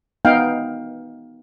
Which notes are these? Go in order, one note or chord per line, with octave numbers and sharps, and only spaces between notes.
B3 D#4 F5 G5